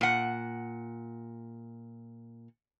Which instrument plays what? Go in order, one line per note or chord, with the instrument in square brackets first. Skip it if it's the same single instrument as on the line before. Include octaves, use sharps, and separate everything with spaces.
[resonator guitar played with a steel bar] A#2 F#5